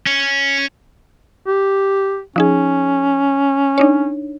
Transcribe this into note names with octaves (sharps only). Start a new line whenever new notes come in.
C#4
G4
F3 C#4 D#4 G#4
D4 D#4 C#5